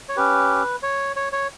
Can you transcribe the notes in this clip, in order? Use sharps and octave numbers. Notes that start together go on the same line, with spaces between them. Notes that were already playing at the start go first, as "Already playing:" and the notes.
C#5
C#4 G4 B4
C#5
C#5
C#5